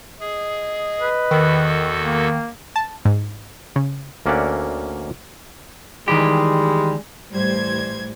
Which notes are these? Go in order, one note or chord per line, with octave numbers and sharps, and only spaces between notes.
G#4 D#5
B4
E2 D#3 F#4 A4
A#3
A5
G#2
C#3
D2 A#3 C#4 D5 E5 F#5
D#3 E3 G3 G#3 G4
A2 E3 G3 C5 G#6